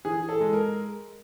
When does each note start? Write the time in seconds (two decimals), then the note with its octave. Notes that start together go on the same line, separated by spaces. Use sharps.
0.05 E3 G#4
0.29 A4
0.40 G#3
0.53 A#4